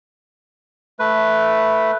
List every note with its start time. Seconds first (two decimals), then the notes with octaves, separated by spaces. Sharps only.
0.99 A3 B4